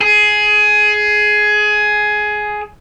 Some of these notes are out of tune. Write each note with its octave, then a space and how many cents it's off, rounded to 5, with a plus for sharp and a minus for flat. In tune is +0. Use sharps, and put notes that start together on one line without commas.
G#4 +15